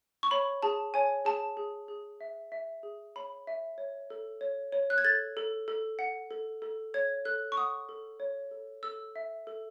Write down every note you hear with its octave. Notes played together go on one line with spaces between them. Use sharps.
C#6
C#5 B5
G#4 A5
C#5 G#5
G#4 A5
G#4
G#4
E5
E5
G#4
C#5 B5
E5
C#5
A4
C#5
C#5
F#6
G#6
A4 A6
A4
A4
F#5
A4
A4
C#5 G#6
A4 F#6
C#6
F#5 D#6
A4
C#5
A4
A4 E6
E5
A4